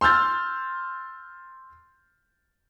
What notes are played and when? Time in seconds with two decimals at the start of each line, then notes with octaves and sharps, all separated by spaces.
0.01 C6 E6 F6 G6 A6